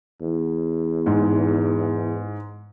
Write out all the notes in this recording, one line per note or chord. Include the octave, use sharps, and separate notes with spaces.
E2
G#2